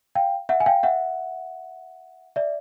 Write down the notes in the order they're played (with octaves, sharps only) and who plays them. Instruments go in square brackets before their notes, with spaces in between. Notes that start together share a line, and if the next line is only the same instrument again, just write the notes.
[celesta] F5 G5
E5 F#5
G#5
F5 G5
E5 F#5
D5 E5